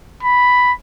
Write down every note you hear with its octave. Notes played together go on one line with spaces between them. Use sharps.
B5